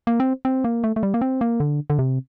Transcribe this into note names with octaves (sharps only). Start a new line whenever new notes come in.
A#3
C4
C4
A#3
A3
A3
G3
A#3
C4
A#3
D3
D3
C3